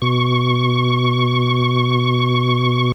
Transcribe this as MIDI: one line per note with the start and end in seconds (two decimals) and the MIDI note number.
0.02 2.92 47
0.02 2.92 85